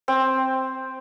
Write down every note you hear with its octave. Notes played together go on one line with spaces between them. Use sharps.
C4